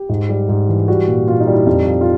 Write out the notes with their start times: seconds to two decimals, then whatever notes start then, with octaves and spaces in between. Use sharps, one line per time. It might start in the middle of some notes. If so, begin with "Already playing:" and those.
Already playing: G4
0.09 G#2
0.29 G3
0.49 G#2
0.69 E3
0.88 G3 F#4
1.08 A#2
1.28 A#2 F4
1.40 D#4
1.47 G3
1.54 E4
1.66 F2 D#4
1.86 F3
2.01 F4